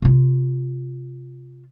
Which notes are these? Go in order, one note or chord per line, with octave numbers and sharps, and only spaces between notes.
C3 F4